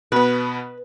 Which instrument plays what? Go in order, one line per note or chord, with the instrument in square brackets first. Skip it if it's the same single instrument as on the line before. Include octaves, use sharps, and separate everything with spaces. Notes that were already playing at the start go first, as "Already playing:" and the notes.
[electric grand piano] B2 B3 [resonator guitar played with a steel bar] B4